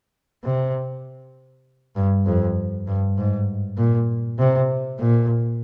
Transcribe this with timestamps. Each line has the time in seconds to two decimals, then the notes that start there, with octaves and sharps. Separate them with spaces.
0.44 C3
1.96 G2
2.26 F2
2.87 G2
3.18 G#2
3.78 A#2
4.39 C3
4.99 A#2